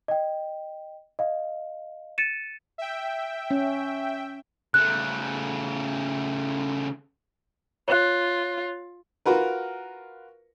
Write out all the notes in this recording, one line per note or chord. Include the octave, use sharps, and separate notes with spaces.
D#5 G5
D#5 F5
A6 C#7 D#7 E7
E5 G5
C#4
C#3 A3 F#6
F4 C#5 F#6
F4 F#4 A#4 B4